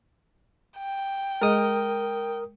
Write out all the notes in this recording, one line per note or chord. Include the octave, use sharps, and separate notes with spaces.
G5
G#3 G#4 A#4 D#5 D#6